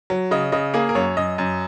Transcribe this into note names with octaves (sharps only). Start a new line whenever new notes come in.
F#3
C#3 D#5
C#3 D#5
A#3 G#4
A#4
F#2 C#5
F#2 D#5
F#2